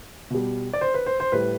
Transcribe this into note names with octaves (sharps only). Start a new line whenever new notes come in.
B2 G3
D5
C5
B4
C5
C5
A2 G3 B4